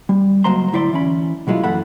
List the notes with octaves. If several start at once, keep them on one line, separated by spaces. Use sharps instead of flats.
G3
C#2 F#3 A#3 C5 A#5 C6
A2 D3 E4 C5 D5 C6
E3 C#4 B5
B2 F#3 G#3 E4 F4
F#2 E3 A#3 A4 F#5 B5